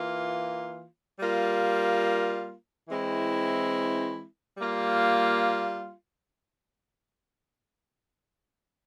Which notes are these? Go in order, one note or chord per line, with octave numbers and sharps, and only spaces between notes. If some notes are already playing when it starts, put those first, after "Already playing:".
Already playing: E3 A#3 F4
G3 A#3 F4
E3 G#3 C4 E4
G3 A#3 F4